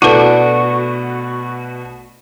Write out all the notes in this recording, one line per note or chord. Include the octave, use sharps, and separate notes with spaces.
B2 A3 B3 D4 E4 F#4 A4